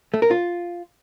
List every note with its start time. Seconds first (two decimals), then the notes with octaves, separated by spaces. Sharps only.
0.14 A3
0.22 A#4
0.31 F4